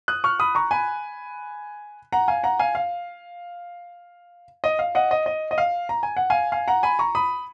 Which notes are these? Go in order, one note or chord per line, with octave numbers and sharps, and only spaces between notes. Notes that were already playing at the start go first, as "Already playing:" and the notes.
D#6 F#6
C#6 F6
B5 D#6
A#5 C#6
G#5 B5
F#5 A#5
F5 G#5
F#5 A#5
F5 G#5
F5
D#5
F5
D#5 F#5
D#5
D#5
D#5
F5
A#5
G#5
F#5
F5 G#5
F5 G#5
F#5 A#5
G#5 B5
A#5 C#6
B5 D#6